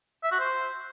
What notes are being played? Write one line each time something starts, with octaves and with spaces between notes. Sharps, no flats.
E5
F#4
C5